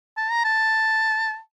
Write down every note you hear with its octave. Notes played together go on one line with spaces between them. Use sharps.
A5
A#5
A5